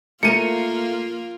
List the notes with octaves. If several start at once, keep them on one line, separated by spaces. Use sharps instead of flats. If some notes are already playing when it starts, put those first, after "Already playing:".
A3 A#3 F4 A#4 C#7 D#7